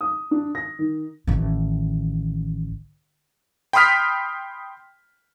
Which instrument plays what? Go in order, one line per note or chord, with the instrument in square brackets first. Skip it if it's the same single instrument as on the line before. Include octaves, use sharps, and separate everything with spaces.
[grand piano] D#6
D4
A#6
D#3
[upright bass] A1 D#3
[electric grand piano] G5 B5 C6 D#6 F6 B6